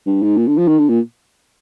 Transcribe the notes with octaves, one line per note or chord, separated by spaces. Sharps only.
G2
G#2
A#2
D3
F3
D#3
D3
A#2